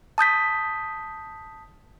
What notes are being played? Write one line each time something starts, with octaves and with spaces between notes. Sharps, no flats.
A5 D#6 G6 B6